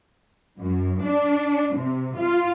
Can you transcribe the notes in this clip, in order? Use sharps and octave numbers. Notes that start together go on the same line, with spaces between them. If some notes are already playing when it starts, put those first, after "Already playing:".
F#2
D4
C3
F4